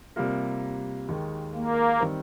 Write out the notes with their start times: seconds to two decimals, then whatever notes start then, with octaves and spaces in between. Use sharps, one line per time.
0.16 C3 G3 A#3 F4 A#4
1.08 D#2 D#3 G#3
1.54 A#3
2.00 D#3 G3 C4